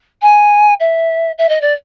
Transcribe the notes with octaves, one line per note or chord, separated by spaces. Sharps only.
G#5
E5
E5
D#5
D5